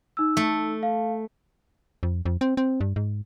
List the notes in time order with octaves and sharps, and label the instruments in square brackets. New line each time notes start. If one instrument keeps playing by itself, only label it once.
[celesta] D#4 E6
[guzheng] A3
[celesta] F5
[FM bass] F2
F2
C4
C4
G2
G#2